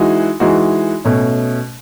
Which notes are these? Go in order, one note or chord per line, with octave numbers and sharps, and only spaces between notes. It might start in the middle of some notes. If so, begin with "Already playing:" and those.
Already playing: E3 G#3 D#4 F#4
E3 G#3 D#4 F#4
B2 A3 C#4